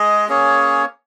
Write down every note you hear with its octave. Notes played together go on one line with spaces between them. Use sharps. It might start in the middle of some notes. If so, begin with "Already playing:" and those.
Already playing: G#3 G#4 D#5
A#3 C#4 G#4 C#5